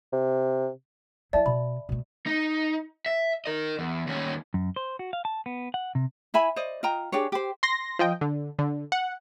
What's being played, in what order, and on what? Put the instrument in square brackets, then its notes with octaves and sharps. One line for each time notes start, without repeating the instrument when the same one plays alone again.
[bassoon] C3
[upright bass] F#3 E4 [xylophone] D5 E5 A5
[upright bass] B2 [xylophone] B5
[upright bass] B2 A3
[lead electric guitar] D#4
E5
A#4 D#5
E2
D#2 C#4
[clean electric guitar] F#2
C5
F#4
F5
A5
B3
F#5
C3
[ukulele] E4 E5 G#5 B5
C5 D5 D#5
F4 D#5 G5 A#5
D4 G4 G#4 C#5
G4 C5
[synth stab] C6 A#6
F3 D#5 G5
D3
D3
F#5